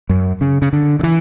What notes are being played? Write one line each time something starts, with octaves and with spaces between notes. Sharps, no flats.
F#2
C#3
C#3
D3
D3
E3